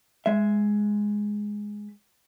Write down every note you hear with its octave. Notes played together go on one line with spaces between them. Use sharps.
G#3 E5